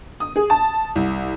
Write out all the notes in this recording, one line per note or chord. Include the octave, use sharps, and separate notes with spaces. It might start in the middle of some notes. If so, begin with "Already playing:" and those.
D#6
G#4
A5
C2